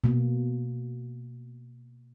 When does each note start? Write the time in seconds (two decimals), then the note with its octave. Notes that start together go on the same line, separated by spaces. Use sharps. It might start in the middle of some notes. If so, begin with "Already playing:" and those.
0.04 B2 A#3